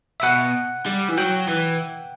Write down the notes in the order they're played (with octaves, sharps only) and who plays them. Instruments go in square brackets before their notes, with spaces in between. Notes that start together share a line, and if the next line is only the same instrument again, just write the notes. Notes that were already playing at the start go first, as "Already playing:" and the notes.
[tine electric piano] E5
[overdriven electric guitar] B2 [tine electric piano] F#5
[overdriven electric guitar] G3
E3
[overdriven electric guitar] F#3 [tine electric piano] G5
[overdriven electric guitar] E3